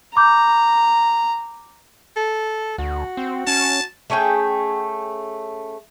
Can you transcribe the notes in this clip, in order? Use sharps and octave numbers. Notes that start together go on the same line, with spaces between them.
A#5 B5 D6 G6
A4
D2 F#4
C4
C#4 A5
A3 C#4 G#4 G5